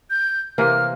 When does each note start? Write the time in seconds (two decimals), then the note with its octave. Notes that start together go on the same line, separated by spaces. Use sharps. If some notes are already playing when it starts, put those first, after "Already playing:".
0.10 G6
0.58 C3 E3 A#3 F6